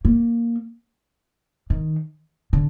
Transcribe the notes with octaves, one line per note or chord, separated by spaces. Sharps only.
A#3
D#3
D3